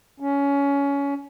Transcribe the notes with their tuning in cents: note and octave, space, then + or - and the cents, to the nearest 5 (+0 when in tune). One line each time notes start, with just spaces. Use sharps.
C#4 +20